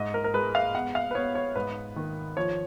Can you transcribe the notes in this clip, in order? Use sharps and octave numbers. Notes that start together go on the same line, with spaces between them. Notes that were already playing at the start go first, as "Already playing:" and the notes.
Already playing: G#2 D#5
A#4
A#4
G#3 B4
F5
B3 F#5
F5
B4
B3 C#5
C#5
G#2 B4
D#3
F3 C#5